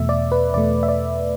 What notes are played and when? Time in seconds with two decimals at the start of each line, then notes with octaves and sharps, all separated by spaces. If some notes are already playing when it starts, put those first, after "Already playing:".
Already playing: E2 B2 A3 E5
0.09 D5
0.32 B4
0.54 E2 B2 A3 D5
0.83 E5
0.88 D5